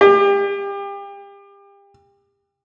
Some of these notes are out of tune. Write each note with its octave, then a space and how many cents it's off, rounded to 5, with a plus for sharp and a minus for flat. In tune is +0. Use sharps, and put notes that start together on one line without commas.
G4 +30